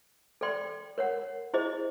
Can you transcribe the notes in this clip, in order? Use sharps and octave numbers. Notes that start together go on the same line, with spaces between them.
A4 D5 G5 C6
A#4 C#5 F#5
E4 G#4 C5 D#5